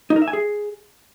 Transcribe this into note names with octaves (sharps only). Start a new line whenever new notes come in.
D#4
A#4
E5
G#5
G#4